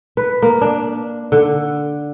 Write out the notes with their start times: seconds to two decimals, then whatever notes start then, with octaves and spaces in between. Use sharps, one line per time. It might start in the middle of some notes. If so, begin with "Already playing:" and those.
0.17 B4
0.42 A#3
0.62 D4
1.32 D3